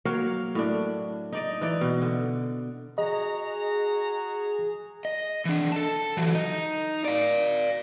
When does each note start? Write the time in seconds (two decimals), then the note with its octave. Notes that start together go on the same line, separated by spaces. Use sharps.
0.05 F#3 A#3 C#5 F5
0.55 A2 D4
1.33 D#4 D5 D#5
1.61 E3 D#4 D5
1.81 B2
2.02 D3
2.98 F#4 G#4 D#5 A#5
5.05 D#5
5.45 E3 D4
5.72 A4 A5
6.17 E3 F#3
6.35 D#4 D#5
7.05 D5 F5